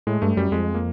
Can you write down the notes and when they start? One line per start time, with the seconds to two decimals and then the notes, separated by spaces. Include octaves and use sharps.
0.07 A2 G#3
0.22 G2 A3
0.37 F#2 G3
0.52 F2 G#3
0.74 A#3